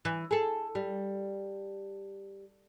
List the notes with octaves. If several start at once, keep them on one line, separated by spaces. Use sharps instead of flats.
E3
G#4 A4
G3